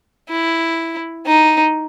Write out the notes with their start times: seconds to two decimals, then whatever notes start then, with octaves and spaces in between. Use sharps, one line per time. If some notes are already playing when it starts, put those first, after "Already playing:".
0.29 E4
1.26 D#4